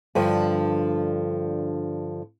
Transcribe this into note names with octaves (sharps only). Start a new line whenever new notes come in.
G2 D3 F3